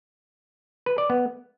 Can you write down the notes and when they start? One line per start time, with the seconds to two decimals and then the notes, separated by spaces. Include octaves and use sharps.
0.86 B4
0.98 D5
1.10 B3